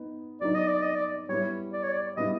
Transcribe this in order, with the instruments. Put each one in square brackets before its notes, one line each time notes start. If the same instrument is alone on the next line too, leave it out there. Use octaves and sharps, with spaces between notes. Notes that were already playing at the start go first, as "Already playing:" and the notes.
Already playing: [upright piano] B3 D#4
[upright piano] F#3 B3 D#4 [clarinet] D5
[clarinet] D#5
D5
D#5
D5
[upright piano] G3 B3 E4 [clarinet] C#5
[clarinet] D5
C#5
D5
[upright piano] G3 B3 E4 [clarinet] D#5